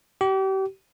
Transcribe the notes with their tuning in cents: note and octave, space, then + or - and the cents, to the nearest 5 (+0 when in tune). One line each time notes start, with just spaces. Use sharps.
G4 -35